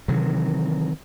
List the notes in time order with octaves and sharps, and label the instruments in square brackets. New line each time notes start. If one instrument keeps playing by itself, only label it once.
[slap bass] C3 D#3 E3 F#3